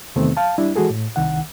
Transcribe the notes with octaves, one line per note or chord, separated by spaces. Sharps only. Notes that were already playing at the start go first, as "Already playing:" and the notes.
E2 C3 D#3 A3 B3 C4
F5 A5
G3 D4 E4
E3 G#3 F#4 G#4 A4
A2
C2 D#3 F#5